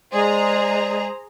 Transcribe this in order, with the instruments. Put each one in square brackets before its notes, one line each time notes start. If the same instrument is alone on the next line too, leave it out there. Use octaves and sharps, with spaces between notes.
[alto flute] G#3 [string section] G#4 A#5 [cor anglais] C5 [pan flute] D5